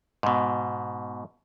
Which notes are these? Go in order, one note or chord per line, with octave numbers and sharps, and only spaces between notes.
G#2 B2